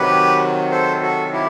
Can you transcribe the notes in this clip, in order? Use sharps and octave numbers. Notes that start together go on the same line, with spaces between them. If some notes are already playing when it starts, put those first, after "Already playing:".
Already playing: C3 D#3 F#3 G4 B4
A4 C5
F#4 A4
E4 G4